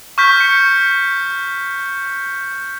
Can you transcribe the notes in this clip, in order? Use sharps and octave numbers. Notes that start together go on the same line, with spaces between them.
C#6 F6 G6 B6
C#7